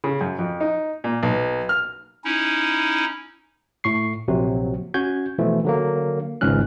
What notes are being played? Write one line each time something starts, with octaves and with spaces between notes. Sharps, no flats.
C#3
F#2
F2
D#4
A#2
B1
F6
C#4 D#4 E4
A2 C#6 C7
A#1 C3 F#3 F#4
C#4 F#4 G6 G#6
B2 E3 F3 A3
D3 F#3 A#3
G#1 C#2 G#2 C#4 F6 F#6